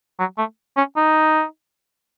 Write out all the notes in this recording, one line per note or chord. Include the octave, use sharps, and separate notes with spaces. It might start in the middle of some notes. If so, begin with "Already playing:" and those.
F#3
A3
C#4
D#4